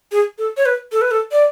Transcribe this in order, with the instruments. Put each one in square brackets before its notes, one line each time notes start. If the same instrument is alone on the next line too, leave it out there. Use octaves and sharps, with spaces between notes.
[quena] G#4
A4
C#5
B4
A4
B4
A4
D5